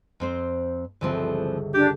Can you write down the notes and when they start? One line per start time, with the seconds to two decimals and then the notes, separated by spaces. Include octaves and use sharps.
0.20 F2 C4 C5
1.01 G1 C#2 E3 F3 C4 E5
1.74 D4 G4